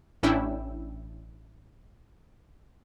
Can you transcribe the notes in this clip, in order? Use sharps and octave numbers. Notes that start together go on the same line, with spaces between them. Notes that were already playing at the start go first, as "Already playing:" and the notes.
A1 C#4 D4 E4 G5 E6